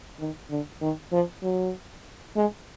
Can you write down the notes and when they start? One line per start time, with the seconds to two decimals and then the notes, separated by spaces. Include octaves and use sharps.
0.19 D#3
0.50 D3
0.81 D#3
1.12 F3
1.43 F#3
2.36 G#3